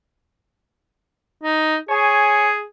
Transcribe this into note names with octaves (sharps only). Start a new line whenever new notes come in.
D#4
G#4 C#5 G#5